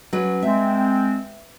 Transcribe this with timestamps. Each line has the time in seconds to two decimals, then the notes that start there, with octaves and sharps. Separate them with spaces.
0.13 F#3 C#4 B4
0.43 G#3 C4 E5